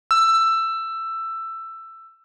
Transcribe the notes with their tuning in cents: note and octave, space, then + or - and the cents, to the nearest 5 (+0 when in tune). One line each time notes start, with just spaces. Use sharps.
E6 +15